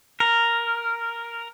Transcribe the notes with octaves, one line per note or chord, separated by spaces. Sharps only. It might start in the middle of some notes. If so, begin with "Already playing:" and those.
A#4